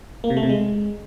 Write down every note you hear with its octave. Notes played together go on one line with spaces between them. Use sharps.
A#3
C3
A3
C3
G#3